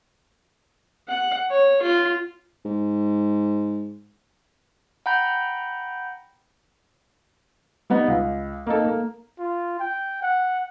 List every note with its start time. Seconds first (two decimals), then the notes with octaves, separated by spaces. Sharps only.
1.08 F#5
1.50 C#5
1.82 F4
2.65 G#2
5.06 F#5 G5 A#5 B5 G6
7.90 G3 B3 D#4
8.08 C#2
8.66 A#3 D#4 A4
8.84 A#3
9.39 F4
9.80 G5
10.22 F#5